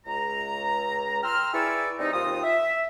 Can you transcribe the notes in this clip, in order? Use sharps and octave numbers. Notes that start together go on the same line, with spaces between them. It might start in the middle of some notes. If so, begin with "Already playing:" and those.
C#2 A#5
G5 A#5 C6 E6 F6
E4 G#4 B4 D5 C#6 E6
C3 G3 C4 D#4
D#2 C4 F4 D#6
E5